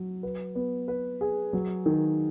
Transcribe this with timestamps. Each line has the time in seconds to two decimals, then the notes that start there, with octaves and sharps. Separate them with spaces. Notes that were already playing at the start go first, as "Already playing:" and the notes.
Already playing: F#3
0.23 B4
0.55 B3
0.88 B4
1.21 G#4
1.53 F#3
1.86 D#3